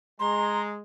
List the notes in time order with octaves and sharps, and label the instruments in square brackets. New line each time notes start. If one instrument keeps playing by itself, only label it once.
[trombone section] G#3 [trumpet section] A#5 [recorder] C6